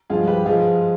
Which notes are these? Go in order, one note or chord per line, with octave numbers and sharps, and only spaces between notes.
G2 F3 G#3 F4 G#4
G4 B4
G#2 F3 G#3 F4 G#4